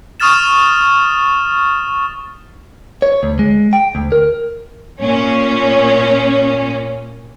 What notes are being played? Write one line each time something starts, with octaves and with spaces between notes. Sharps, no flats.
C#6 D#6 F6 A6 E7
C#5
D2
G#3
G5
D2
A#4
A#2 C#4